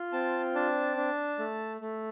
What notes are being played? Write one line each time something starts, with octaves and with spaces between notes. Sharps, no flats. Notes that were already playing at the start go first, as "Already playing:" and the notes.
Already playing: F4
C4 A5
D4 A5
D4
A3
A3